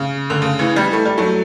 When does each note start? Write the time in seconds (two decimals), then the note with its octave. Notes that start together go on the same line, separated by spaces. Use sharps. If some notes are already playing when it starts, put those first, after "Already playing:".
Already playing: C#3
0.30 D3
0.42 C#3
0.59 C#3 E3
0.76 E3 G3
0.93 A3
1.05 G3
1.17 F#3 A3